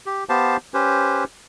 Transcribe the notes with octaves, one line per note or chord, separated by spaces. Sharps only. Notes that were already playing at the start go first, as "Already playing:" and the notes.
G4
B3 G4 C5 F5 A5
C#4 G4 B4 C5